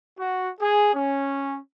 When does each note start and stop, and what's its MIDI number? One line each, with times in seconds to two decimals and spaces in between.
0.18 0.50 66
0.60 0.93 68
0.94 1.59 61